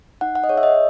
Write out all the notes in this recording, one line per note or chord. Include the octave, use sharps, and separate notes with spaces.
D#4 F#5
F#5
D#5
G#4 C#5
E5
D#5